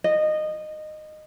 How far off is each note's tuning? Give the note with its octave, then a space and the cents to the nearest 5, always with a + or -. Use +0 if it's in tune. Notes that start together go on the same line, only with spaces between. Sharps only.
D#5 -15